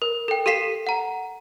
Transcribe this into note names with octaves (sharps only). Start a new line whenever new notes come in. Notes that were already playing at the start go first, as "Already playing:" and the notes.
A#4
A4 G5
G4 A4 F5 B6 C7 E7
F#5 A#5